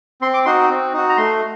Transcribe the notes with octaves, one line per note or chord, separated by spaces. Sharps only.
C4 C6
D6
D#4 F#4 C6
C4
D#4 F#4
A#5
A3 C6